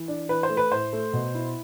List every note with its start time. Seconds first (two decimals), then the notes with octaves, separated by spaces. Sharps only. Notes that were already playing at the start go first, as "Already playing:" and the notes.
Already playing: E3
0.08 D4
0.29 E3 B4
0.43 C5
0.50 A3
0.57 B4
0.72 A2 C5
0.93 A3
1.13 B2
1.35 E4